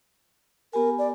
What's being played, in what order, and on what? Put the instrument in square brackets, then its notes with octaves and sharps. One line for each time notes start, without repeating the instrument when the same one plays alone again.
[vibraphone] B3 G4 G#5 [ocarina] A#4
[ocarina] D5